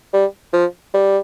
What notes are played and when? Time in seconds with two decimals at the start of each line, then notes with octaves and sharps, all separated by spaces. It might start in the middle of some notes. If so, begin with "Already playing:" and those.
0.13 G3
0.53 F3
0.94 G3